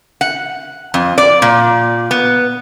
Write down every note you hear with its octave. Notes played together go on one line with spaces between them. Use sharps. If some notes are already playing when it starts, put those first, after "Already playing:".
F#5
F2
D5
A#2
B3